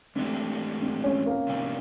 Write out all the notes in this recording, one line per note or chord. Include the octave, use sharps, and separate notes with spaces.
G#2 E3 A3 C4 D4 G4
C4
C#4
A#3
C3 D#3 G3